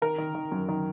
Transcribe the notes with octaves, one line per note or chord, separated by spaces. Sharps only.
D#3 A#4
D#3
D#3
F#2
D#3